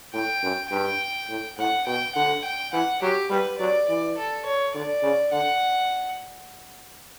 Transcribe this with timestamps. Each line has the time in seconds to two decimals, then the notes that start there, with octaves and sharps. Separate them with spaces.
0.14 A2 G5
0.43 F#2
0.71 G2 G5
1.29 A2
1.58 A2 F#5
1.86 B2 G5
2.15 D3 F#5
2.45 G5
2.73 E3 F#5
3.02 F#3 G4
3.30 G3 B4
3.59 F#3 D5
3.88 E3 D5
4.17 A4
4.46 C#5
4.75 D3 D5
5.03 C#3
5.32 D3 F#5